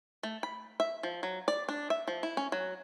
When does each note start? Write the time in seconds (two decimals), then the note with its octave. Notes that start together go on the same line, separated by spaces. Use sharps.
0.23 A3
0.43 B5
0.80 E5
1.03 F3
1.23 F#3
1.48 D5
1.69 D4
1.90 E5
2.08 F3
2.23 E4
2.37 C#4
2.52 F#3